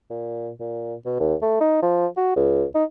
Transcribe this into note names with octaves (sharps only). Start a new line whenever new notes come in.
A#2
A#2
B2
D#2
A3
D#4
F3
F#4
C#2
D#4